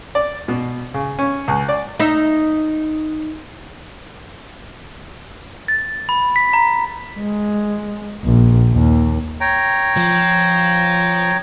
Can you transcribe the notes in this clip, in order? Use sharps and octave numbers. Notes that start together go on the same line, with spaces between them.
D5
B2
C#3
C#4
C#2
D5
D#4 E5
A6
B5
B6
A#5
G#3
A#1
D#2
C#5 G5 A#5
F3